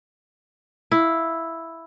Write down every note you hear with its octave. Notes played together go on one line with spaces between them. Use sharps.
E4 F5